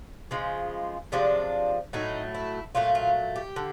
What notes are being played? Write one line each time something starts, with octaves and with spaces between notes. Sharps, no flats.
C#3 F3 G#3
C3 F3 G#3 D4
A2 F#3 A3 D#4
E4
A#2 F#3 A3 F4
F4
G4
D3